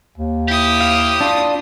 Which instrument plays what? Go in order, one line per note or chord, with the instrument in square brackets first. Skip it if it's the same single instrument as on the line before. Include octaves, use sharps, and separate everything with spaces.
[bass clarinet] D#2
[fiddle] E4 D#6 [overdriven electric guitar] G4
[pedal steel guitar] F5
D4 F4